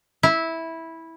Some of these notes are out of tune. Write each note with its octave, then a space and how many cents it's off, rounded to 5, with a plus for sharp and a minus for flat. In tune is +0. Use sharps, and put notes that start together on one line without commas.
E4 -10